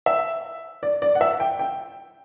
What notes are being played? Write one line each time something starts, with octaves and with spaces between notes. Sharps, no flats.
E5
D5
D5
F#5
E5
G5
G5